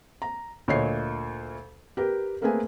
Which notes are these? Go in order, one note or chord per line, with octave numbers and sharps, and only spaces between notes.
A#5
D2 A#2 C#5 D#5 C7
G4 A#4 B4
A3 A#3 C4 G#4 B4 G#5